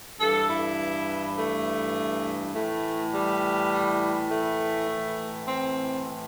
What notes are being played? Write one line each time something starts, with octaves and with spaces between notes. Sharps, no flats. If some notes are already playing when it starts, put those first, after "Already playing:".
G2 E3 A4
E4
A3
A2 E3 A3
G3
A3
A2 E3
C4